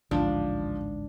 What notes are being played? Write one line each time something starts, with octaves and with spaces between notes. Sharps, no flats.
A1 D2 G#2 F3 D4